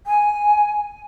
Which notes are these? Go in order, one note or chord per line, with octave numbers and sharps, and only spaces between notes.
G#5